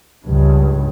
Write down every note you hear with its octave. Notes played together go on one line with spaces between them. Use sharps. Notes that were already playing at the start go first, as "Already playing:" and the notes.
C#2 G2